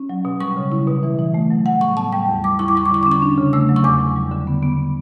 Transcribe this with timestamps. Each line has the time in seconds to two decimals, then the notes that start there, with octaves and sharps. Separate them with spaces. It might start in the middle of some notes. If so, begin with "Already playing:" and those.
Already playing: C#4
0.09 F#3
0.25 B2
0.40 G3 C#6
0.56 C#3
0.72 E4
0.88 B2
1.03 E3
1.19 E3
1.34 A3
1.50 F#3
1.66 G3 F#5
1.81 A2 C#6
1.97 B3 A5
2.12 G3 G5
2.29 E2
2.44 G3 D6
2.59 E4 C#6
2.68 D6
2.75 G3 C#6
2.86 D6
2.91 D3 C#6
3.03 D6
3.07 C#4 C#6
3.22 D4
3.38 C#3
3.53 A3 E6
3.69 F#3
3.76 C#6
3.84 E2 D6
4.00 E2
4.16 G3
4.32 D3
4.47 B3
4.63 B3